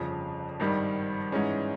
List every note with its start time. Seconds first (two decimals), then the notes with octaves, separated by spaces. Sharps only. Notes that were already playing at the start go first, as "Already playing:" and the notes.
Already playing: G1 F2 C#3 F3
0.60 G#1 G2 D#3 G3
1.32 G#2 E3 G#3 C#4